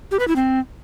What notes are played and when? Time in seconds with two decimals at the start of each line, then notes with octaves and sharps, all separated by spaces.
0.11 G4
0.19 B4
0.28 E4
0.36 C4